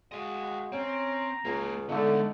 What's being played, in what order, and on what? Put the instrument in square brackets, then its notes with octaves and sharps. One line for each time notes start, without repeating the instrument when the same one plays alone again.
[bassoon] G#3 [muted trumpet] F#4 [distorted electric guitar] D#5 F5
[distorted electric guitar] C4 [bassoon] C#4 [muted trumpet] A#5
[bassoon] C#2 [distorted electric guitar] A#3 C#5
[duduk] D3 [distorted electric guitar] G#3 B3 [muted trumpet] A3 [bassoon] D#4